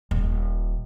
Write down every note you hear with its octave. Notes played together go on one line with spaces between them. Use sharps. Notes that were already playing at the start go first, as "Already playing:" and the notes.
D#1